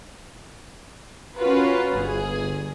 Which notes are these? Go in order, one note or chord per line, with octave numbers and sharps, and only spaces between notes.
C#4 F4 F#4 A#4 B4
G1 G#4